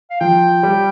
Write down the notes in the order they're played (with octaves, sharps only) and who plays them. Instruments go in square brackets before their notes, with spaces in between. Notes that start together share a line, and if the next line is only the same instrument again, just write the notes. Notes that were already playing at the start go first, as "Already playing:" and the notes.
[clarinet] F5
[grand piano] F3 [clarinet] G5
[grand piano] G3